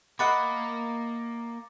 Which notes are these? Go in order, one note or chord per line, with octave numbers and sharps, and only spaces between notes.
A#3 D#5 F#5 B5 D6 A6 C#7